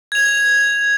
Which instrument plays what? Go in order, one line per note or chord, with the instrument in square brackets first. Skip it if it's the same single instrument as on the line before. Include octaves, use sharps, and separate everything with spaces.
[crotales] G#6 F7